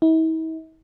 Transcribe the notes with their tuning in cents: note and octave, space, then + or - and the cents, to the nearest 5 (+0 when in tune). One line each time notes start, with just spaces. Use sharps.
E4 -45